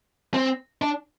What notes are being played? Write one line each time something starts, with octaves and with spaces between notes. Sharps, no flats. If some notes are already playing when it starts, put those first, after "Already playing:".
C4
D4